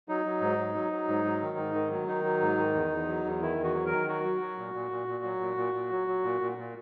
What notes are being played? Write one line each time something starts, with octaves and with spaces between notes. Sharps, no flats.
F#3 D#4
F#3
G#2
F#3
F#3
F#3
G#2
F#3
D#3
G#2
D#3
F#3
D#3 D#4
F#3
G#2
D#3
E2
E2
F#3
E2
D#3 E4
E2
F#4
F#3
A#4
D#3
F#3 F#4
F#3
F#3
A#2
A#2
A#2
A#2
F#3
A#2
A#2
A#2
F#3
F#3
A#2
A#2
A#2